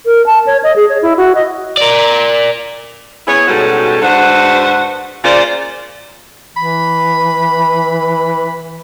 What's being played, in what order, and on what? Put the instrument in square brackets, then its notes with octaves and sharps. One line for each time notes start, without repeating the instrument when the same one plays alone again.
[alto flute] A#4
A5
C#5
D#5
G#4
C#5
E4
F#4
D#5
[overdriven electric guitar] A#4 D5
[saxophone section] B3 E4 G#4 C#5
G#2 B2 G3 C#4 F#4 A4
G#2 D4 F#4 B4 C5 F#5
C#3 A#3 F4 C5 D5
[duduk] E3 [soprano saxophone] B5